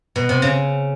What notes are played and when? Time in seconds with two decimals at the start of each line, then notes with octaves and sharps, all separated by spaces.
0.16 B2
0.29 C3
0.42 C#3